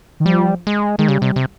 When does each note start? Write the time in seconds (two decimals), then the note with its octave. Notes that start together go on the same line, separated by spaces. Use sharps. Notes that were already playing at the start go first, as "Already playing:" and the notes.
0.20 D#3
0.25 F3 G3
0.67 G#3
0.98 D#3 G#3
1.08 C#3 G3
1.22 C3
1.36 C3